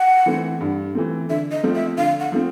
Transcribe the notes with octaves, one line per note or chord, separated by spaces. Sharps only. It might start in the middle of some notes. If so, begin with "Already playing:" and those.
Already playing: F#5
E3 A3 C4
G2
E3 A3 C4
D3 E5
D#5
F3 A3 C4
E5
D3 F5
F#5
F3 A3 C4